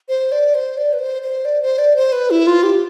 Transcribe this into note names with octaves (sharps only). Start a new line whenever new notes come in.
C5
D5
C5
D5
B4
C5
C5
D5
C5
D5
C5
B4
E4
F4
G4